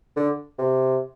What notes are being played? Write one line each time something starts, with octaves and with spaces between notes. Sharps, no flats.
D3
C3